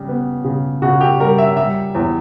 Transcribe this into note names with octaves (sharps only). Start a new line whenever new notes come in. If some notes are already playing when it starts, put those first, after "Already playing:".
Already playing: C#3 G3
B3
C#3
C#3 F#4
G4
G3 A#4
E5
G3 E5
E2